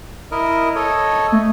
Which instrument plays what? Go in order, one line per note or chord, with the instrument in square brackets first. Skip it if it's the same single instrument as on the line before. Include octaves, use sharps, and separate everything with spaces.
[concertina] E4 A#4 D#5
A4 C#5 D#5
[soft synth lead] A3